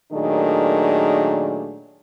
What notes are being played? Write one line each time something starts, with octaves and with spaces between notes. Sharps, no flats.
A#2 D#3 F#3 A3 D4 G#4